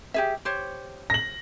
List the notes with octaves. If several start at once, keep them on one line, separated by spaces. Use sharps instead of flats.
G4 G#4 E5
G4 C5 C#5
A#6 F#7